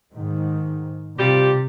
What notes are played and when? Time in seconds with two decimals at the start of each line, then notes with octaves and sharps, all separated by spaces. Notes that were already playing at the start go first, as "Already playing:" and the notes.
0.14 G#2 D#3
1.19 C3 G3 F4 G4